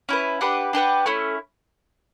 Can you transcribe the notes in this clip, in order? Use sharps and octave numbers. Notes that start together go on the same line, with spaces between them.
C#4 E4 B4
D4 G4 B4 F#5
D4 G4 B4 F#5
A3 C#4 E4